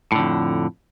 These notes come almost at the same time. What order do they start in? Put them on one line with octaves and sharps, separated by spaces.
A2 D3 F2